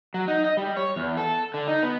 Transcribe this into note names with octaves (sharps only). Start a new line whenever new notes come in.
F#3
D#4
D#5
G3
C#5
E2
A4
D3
D#4
B3